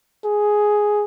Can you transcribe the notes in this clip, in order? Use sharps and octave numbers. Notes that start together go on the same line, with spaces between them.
G#4